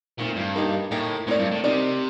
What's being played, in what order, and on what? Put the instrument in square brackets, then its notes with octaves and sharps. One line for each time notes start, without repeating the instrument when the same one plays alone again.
[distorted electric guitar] A#2 [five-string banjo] D#3 A3 C4
[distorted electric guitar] G2
[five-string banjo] A#3 D#4 G4 A#4
[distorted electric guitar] A2 [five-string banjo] A#3 D#4 G4 A#4
[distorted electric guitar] A2 [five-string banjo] C4 D#4 A#4 D5
[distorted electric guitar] G2
A2
[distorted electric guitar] C3 [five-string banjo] C4 D#4 A#4 D5